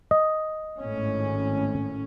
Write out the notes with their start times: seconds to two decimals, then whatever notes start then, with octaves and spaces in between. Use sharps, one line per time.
0.11 D#5
0.79 G#1 A2 C#4